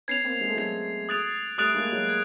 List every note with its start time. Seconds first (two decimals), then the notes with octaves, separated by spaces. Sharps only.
0.08 B3 C#4 G#6 C7 F7
0.24 A#3 C4
0.41 G#3
0.49 A3
0.55 F#3 G#3 G#6 C7 F7
1.09 D#6 F#6 A6 D7 F7
1.58 G3 A3 D#6 F#6 A6 D7 F7
1.74 G#3 A#3
1.92 F#3 G#3
2.09 G#6